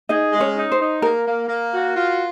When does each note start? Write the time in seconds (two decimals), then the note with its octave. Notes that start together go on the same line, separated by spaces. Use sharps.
0.09 D#4 G#4 D#5
0.33 G#3
0.40 C#4 C#5
0.56 D#4
0.72 C5
0.80 D#4
1.02 A#3 A#4
1.26 A#3
1.49 A#3
1.72 F#4
1.95 F4